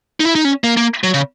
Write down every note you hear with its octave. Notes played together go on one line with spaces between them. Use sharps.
D#4
E4
D#4
C#4
A#3
A#3
F#3
C#3